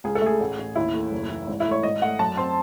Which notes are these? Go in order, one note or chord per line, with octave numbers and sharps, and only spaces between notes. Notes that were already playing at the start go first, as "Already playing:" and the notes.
C#2 G#4
A4
A3 G#4
A1
A1
D#2 E4
A3
F#1
E3
G#1
E4
A3
C#5
G#1 D#5
A3 F#5
F#2 A5
C4 C6